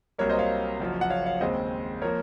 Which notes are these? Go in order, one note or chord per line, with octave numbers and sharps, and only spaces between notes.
C2 C3 F#3 A#3 A#4 C#5
C5 D#5
C#5 F5
F#1 F#2 F3
F#5
C#5 F5
C#5 F5
D#2 C#3 G#3 C4 C5 D#5
F3 A#3 A#4 C#5